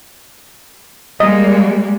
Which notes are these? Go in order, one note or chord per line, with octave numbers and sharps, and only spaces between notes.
G3 G#3 A#3 D#5